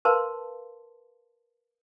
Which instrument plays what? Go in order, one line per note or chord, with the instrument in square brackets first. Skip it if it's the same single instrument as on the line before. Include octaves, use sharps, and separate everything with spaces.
[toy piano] A#4 B4 F5 A5 C6